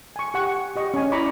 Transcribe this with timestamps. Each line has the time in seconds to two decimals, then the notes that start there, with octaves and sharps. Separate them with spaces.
0.16 G#5 C#6
0.34 G4 F#5 C#6
0.76 G4 D#5 C#6
0.94 C#4 G#5
1.12 E4 D5 A#5 B5 C#6 D6